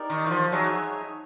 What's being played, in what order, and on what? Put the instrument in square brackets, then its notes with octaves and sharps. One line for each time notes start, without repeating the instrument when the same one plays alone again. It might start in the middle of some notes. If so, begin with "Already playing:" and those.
Already playing: [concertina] D#4 G4 A#4 D5
[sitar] D#3
E3
F3
[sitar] F#3 [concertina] D#4 G#4 C#5 E5 G#5